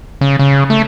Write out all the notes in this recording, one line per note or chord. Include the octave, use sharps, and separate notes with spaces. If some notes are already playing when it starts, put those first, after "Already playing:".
C#3
C#3
A3